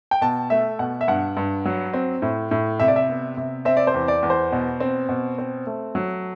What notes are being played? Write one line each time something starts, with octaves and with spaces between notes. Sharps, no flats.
G5
B2 A5
A3 E5
B2 F#5
E5
G2 F#5
G2
F#3
C4
A2
A2
C3 E5
D5
E5
B3
C3
C4 E5
D5
C5
E2
D5
E2
C5
B2
C4
B2
C4
A3
F#3